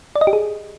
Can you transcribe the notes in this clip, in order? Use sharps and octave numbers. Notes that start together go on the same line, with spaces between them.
D5
D#5
G4
G#4